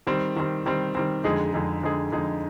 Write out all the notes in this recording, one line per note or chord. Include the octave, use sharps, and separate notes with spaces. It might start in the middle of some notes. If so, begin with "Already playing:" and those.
D#3 G3 C4
D#3 G3 C4
D#3 G3 C4
D#3 G3 C4
F2 D3 G#3 D#4 G#4
F2 D3 G#3 D#4 G#4
F2 D3 G#3 D#4 G#4
F2 D3 G#3 D#4 G#4